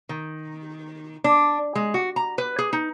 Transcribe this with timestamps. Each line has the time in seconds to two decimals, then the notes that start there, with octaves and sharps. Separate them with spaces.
0.09 D#3
1.24 D4
1.75 G#3
1.94 F#4
2.16 A#5
2.38 B4
2.59 G#4
2.73 D#4